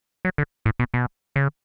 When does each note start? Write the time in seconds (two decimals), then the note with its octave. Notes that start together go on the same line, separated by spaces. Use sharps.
0.25 F#3
0.38 D3
0.65 A2
0.79 B2
0.94 B2
1.36 C#3